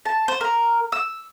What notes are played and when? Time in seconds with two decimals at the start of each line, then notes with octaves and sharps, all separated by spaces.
0.05 A5
0.28 C5
0.41 A#4
0.92 E6